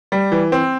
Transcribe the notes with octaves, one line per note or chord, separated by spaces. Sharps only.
G3
E3
C4